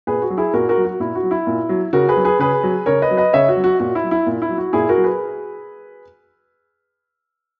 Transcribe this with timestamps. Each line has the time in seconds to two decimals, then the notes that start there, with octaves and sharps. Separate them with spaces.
0.07 A#2 G#4 B4
0.22 F#4
0.30 F#3
0.37 E4 G#4
0.53 A#2 F#4 A#4
0.69 F#4 A#4
0.77 F#3
0.85 F#4
1.00 A#2 E4
1.15 F#4
1.23 F#3
1.31 E4
1.47 A#2
1.69 F#3
1.93 C#3 F#4 A#4
2.09 G#4 B4
2.16 F#3
2.25 G#4 B4
2.39 C#3 G#4 B4
2.63 F#3
2.86 C#3 A#4 C#5
3.02 B4 D#5
3.11 F#3
3.17 B4 D#5
3.33 C#3 C#5 E5
3.49 F#4
3.57 F#3
3.64 F#4
3.80 A#2 F#4
3.95 E4
4.03 F#3
4.11 E4
4.26 A#2
4.42 E4
4.49 F#3
4.58 F#4
4.73 A#2 E4 G#4
4.89 F#4 A#4
4.97 F#3
5.04 G#4 B4